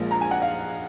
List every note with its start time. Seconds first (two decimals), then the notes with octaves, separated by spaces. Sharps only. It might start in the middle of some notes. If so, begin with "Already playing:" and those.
Already playing: A#1 A#2 F3 G#3 A#4
0.11 A#5
0.21 G#5
0.31 F#5
0.42 F5